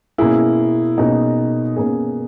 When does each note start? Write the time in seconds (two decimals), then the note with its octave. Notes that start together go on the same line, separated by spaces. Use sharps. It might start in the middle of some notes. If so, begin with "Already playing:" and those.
0.18 B2 A#3 C#4 E4 G#4
0.98 B2 A#3 C#4 D#4 G#4
1.76 B2 A#3 C#4 G#4